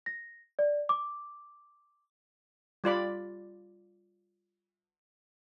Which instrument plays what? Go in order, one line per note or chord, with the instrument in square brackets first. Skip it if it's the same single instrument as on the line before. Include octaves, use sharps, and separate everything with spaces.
[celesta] A#6
D5
D6
[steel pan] G3 F4 D5 B5